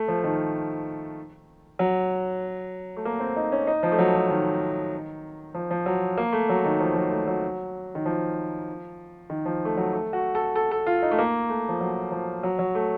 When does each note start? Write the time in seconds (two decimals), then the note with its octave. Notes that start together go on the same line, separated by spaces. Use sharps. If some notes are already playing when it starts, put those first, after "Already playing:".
Already playing: A3
0.08 F3
0.24 D#3
1.79 F#3
2.97 A3
3.05 A#3
3.20 C4
3.36 D#4
3.52 C#4
3.67 D#4
3.83 F3
3.92 A3
3.99 F#3
4.14 F3
4.30 D#3
5.54 F3
5.71 F3
5.86 F#3
6.17 A#3
6.33 A3
6.49 F#3
6.65 D#3
6.80 F3
6.96 F#3
7.11 A3
7.27 F#3
7.95 D#3
8.06 F3
9.30 D#3
9.46 F3
9.65 A3
9.77 F#3
9.93 A3
10.13 F#4
10.35 A4
10.56 A4
10.71 A4
10.87 F4
11.02 D#4
11.11 A3
11.19 A#3
11.49 A3
11.69 F3
11.81 F#3
12.11 F3
12.43 F#3
12.59 F#3
12.75 A3